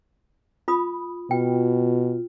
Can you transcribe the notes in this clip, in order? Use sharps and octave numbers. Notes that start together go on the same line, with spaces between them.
F4 B5 D#6
B2 F4 G5